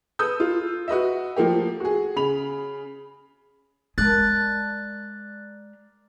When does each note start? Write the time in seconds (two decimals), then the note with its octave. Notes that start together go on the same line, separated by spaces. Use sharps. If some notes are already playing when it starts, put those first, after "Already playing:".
0.19 A4 B4 D#6 E6 G6
0.40 F4
0.88 F#4 B4 D#5 E5
1.36 F3 A3 A#3 G4
1.80 F#4 G#4
2.16 C#3 B5 F7
3.98 G#3 A#4 D5 A5 F#6 A6